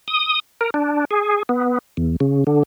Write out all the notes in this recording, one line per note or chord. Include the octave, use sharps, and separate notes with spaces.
D#6
A#4
D4
G#4
B3
E2
C#3
D3